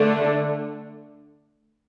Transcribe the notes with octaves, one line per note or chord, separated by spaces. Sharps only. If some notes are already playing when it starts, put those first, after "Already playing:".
Already playing: D3 A3 D4